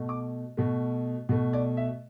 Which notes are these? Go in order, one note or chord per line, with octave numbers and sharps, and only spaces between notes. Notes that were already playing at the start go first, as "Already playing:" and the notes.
Already playing: B2 A3
D6
B2 A3
B2 A3
D5
E5